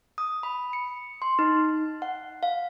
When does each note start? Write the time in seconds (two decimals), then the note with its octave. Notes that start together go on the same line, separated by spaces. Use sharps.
0.18 D#6
0.43 B5
0.73 C#7
1.22 C6
1.39 D#4
2.02 F#5
2.43 F5